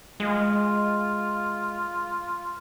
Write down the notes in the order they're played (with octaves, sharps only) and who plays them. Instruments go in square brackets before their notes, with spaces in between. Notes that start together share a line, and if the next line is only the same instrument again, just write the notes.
[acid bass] G#3 [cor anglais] F4